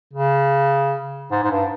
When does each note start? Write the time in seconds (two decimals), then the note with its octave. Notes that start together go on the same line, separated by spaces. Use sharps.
0.13 C#3
1.31 G#2
1.43 G#2
1.51 G2